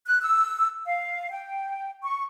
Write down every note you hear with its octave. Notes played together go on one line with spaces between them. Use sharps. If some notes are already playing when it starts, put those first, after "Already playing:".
F#6
E6
F5
G5
C#6